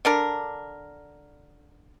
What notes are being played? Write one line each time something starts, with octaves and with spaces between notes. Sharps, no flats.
D3 D4 A#4